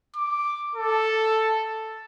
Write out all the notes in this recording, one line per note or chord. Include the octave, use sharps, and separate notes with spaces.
D6
A4